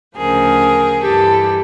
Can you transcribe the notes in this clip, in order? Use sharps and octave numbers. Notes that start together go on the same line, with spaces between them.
D2 C#3 F3 G#4 A#4
G2 E3 G4 A4